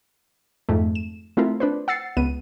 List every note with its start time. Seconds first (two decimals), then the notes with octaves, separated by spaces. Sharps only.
0.69 F2 G#2 A3
0.95 E7
1.37 A3 C4 E4 F4 A#4
1.60 D4 B4 C5
1.88 F#5 E6 A6 C7 C#7
2.17 C#2 B3 D#7